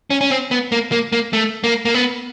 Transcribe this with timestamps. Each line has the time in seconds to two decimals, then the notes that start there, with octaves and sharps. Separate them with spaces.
0.10 C#4
0.21 C#4
0.31 C4
0.51 B3
0.72 A#3
0.92 A#3
1.12 A#3
1.33 A3
1.64 A#3
1.85 A#3
1.94 B3